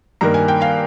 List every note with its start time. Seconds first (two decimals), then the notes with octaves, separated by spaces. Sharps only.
0.21 G2 D#3 A#3 A#5
0.34 G#5
0.48 G5
0.61 F5 G#5